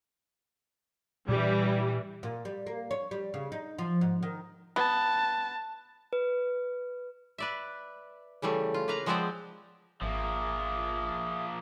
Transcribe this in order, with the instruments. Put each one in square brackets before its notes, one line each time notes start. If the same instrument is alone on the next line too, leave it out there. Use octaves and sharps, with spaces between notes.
[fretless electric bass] A#2 D4 [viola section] E3 G3
[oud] A#2
G3
A#3
C#5
G3
C#3
D#4
F3
G#2
D#3
[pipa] B3 [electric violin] A5
[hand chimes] B4
[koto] B4 D5 E5
C#3 E3 G3 A3
F4
A#3 B4 F5 A#5
F3 G#3 B3 C4 C5 D5
[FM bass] G#1 [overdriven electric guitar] F3 A#3 [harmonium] G#4 E5